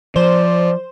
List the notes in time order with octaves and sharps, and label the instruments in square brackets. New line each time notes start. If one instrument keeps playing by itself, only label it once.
[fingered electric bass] F3 [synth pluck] C5 [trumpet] D5